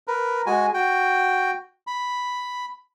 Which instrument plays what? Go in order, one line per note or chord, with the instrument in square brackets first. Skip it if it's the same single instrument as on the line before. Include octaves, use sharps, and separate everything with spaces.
[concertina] A#4 B4
G#3 F#4 G#5
F#4 G5
B5